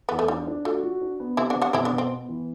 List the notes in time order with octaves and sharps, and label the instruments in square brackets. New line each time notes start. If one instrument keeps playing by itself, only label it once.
[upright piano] E2 [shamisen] B3
[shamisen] A3
[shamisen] G3 [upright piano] D4
[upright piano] D4
[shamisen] A3 [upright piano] F#4
[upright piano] F#4
D4
B3
[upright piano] C3 [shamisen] C4 E4
[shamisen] D4 F#4
[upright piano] C3
[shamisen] D4 F#4
[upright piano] B2 [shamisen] C4 E4
[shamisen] B3 D4
[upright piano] B2
[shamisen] C4
[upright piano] B3
E3